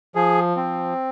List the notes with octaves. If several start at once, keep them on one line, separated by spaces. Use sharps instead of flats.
F3 G#4
C4